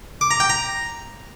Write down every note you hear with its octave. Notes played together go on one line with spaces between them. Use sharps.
D6
A#5
G5
A#5